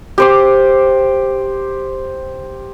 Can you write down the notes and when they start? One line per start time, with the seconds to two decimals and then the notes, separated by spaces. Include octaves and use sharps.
0.18 G4 C5 D6